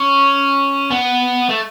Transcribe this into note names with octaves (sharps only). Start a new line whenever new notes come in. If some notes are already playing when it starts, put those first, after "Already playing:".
Already playing: C#4
B3
A3